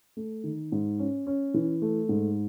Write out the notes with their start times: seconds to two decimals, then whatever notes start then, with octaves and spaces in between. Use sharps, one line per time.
0.17 A3
0.44 D#3
0.72 G#2
0.99 C#4
1.26 C#4
1.54 E3
1.82 A3
2.09 G#2